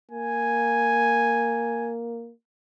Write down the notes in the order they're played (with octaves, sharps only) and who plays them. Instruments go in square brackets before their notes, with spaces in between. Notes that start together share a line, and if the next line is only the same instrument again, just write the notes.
[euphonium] A#3 [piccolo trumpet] G#5